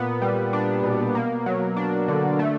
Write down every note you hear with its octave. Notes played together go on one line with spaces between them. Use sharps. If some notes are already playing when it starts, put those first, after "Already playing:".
Already playing: A#2 B3
G3
D4
B2
A#3
F#3
D4
D3
A3